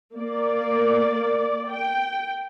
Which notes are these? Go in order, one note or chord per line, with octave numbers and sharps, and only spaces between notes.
A#3 D5
G5